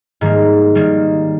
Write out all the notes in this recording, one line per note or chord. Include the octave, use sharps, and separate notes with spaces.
G#2 D#3 G3 A#3
D#3 G3 A#3